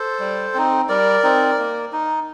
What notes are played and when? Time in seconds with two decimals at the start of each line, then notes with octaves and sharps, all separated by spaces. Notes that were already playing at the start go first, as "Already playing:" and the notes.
Already playing: A4 C5
0.20 G3
0.54 C4 D#4
0.89 G3 A#4 D5
1.23 C4 D#4
1.58 A#3
1.92 D#4